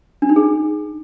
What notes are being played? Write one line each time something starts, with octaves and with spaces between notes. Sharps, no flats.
D4
D#4
G#4